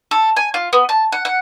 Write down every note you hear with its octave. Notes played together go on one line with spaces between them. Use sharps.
A4
G#5
F4
B3
A5
F#5
F#5